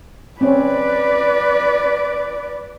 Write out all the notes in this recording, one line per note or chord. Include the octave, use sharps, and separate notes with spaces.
C4 C#4 B4 D5